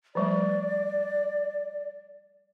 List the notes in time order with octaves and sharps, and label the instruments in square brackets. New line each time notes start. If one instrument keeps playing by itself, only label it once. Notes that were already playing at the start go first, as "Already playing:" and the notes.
[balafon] F3 G3 A3 [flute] D5